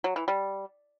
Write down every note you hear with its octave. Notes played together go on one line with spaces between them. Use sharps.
F#3
E3
G3